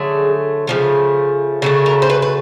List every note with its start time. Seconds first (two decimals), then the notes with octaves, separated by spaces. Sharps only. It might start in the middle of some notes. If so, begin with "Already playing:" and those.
Already playing: D3 F#3 A3 G#4
0.67 C#3 F3 A3
1.62 C#3 F#3 A3 A4
1.86 A#4
2.02 C5
2.10 B4
2.22 B4